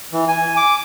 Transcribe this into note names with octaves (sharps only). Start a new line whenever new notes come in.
E3
G#5
D6